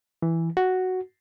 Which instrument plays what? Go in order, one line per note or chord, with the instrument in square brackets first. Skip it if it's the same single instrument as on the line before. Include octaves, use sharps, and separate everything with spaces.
[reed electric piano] E3
F#4